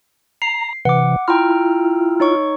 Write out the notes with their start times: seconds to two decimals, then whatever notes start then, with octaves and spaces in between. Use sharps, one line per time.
0.42 A#5 C7
0.85 C3 E3 F#5 D6
1.28 E4 F4 G5 A#5 F6
2.20 D#4 C#5 C#6